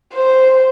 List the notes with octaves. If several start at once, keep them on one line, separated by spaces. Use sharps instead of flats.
C5